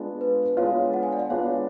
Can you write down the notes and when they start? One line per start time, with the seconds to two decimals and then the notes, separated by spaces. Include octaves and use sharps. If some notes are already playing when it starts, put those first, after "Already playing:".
Already playing: G#3 B3 D4 F4
0.21 B4
0.57 G#3 B3 D4 F4 C#5 F5
0.93 F#5
1.03 G#5
1.12 D5 F#5
1.30 G#3 B3 D4 F4 C#5 F5